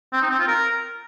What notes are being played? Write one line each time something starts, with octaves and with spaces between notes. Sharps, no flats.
C4
D#4
C4
F4
A#4